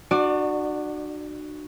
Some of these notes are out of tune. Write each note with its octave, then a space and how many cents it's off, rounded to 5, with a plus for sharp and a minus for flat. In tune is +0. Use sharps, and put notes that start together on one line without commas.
D4 +45 F#4 +0 D5 +20